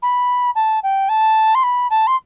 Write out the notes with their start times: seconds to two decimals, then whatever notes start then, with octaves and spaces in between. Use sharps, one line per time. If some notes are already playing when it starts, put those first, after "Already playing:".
0.02 B5
0.55 A5
0.83 G5
1.09 A5
1.55 C6
1.63 B5
1.90 A5
2.07 C6